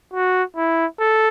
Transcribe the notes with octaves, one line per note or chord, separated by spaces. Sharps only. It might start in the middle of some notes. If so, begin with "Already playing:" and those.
F#4
E4
A4